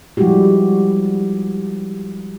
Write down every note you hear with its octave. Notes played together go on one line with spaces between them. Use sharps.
F3 G3 G#3 E4 F#4 G4